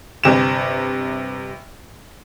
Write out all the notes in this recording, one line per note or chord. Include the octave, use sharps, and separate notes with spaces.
G1 C3 E7